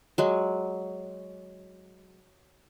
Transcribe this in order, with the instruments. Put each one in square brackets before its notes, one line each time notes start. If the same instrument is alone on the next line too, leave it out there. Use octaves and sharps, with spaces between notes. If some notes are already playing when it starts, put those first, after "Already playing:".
[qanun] F#3 G#3